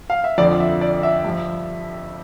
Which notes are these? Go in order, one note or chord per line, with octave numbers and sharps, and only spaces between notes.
F5
E5
F2 D3 F3 D5
E5
D5
E5
G2 F3